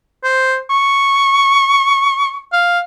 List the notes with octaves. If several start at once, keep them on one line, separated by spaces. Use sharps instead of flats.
C5
C#6
F5